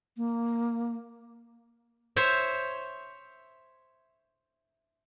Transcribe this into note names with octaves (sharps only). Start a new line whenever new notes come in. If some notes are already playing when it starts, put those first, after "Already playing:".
A#3
C5 C#5 E5